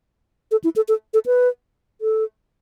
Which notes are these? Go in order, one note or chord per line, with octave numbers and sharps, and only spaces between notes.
A4
E4
A4
A4
A4
B4
A4